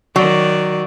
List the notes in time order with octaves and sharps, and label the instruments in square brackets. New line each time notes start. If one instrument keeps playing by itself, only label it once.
[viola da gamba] D#3 D5 [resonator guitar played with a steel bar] F#3